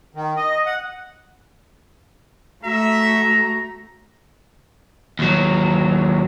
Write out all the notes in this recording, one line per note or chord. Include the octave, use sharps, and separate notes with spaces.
D#3
D#5
F#5
A3 F#4 E5 A#5
D#2 F#3